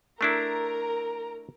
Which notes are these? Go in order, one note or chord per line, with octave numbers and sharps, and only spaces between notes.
A3 D4 E4 A#4 A#5